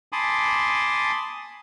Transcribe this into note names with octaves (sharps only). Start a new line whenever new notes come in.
G#5 A5 B5 C6 D6 D#6